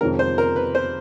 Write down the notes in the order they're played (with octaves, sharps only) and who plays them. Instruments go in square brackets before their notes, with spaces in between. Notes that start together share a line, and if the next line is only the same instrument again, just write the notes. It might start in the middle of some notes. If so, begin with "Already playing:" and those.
[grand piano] F2 C3 D#3 G#3 C#4 [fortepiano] A#4
[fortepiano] C5
A#4
B4
C5